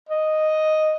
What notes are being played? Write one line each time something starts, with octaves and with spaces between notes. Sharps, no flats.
D#5